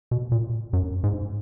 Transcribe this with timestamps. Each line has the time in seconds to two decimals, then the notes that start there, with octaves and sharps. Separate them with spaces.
0.11 B2
0.32 A#2
0.73 F#2
1.04 G#2